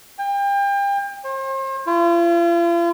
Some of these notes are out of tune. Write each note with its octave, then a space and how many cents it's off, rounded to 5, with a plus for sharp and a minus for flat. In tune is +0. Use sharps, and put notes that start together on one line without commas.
G5 +35
C5 +40
F4 -40